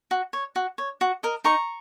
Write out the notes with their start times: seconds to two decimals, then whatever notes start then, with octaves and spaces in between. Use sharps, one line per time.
0.11 F#4
0.33 C#5
0.56 F#4
0.78 C#5
1.01 F#4
1.23 A#4 D#5
1.44 D#4 A#5 C#6